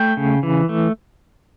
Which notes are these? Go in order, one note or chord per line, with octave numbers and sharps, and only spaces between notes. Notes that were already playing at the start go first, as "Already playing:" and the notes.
Already playing: A3 G5
C#3
E3
A3